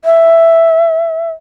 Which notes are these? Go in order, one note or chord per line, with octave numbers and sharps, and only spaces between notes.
E5